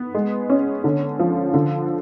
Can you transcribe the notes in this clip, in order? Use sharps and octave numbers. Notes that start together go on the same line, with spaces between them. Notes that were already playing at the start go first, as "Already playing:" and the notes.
Already playing: B3
G#3
C#4
D3
F3
D3